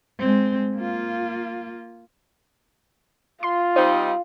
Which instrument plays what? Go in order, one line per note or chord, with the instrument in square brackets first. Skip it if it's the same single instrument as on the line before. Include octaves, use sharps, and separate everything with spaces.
[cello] G#3 C4
A#3 F4
[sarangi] F4 [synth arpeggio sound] C6
[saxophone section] G3 C4 D#4 [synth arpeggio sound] C5